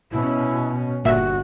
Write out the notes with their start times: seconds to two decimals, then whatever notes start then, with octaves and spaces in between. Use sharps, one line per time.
0.11 B2 C#4 E4
1.05 G1 A#2 F#4 E5